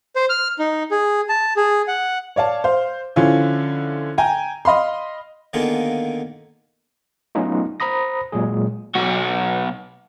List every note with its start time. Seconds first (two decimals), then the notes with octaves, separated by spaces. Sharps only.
0.16 C5
0.30 F6
0.59 D#4
0.91 G#4
1.29 A5
1.57 G#4
1.88 F#5
2.36 C#5 D5 F5 A5
2.64 C5 F5
3.16 D3 F3 C#4 E4 F4
4.18 G5 G#5 A#5
4.65 D#5 F5 B5 C6
5.53 D3 D#3 A#3 B3 F4 G#4
7.35 F#3 A3 B3 C#4 D#4 F4
7.80 C5 A#5 B5 D#6 A#6
8.32 A#2 F#3 G#3 G#4
8.95 B1 F#4